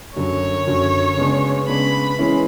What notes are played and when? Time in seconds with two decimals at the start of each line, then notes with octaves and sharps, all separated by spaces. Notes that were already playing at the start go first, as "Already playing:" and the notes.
0.16 F#2 D3 F#3 C#5
0.67 F#2 D3 F#3
1.17 C#3 G#3 B3 D4
1.68 C#3 G#3 B3 D4 B5
2.18 E3 G#3 C#4 E4